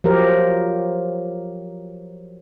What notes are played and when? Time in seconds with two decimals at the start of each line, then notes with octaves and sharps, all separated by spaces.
0.04 F3 F#3 G4 A#4